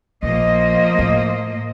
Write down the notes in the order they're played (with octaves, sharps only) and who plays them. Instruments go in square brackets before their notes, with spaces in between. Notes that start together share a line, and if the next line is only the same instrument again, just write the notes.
[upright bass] A#1 [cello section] F3 A#3 D#5
[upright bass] A2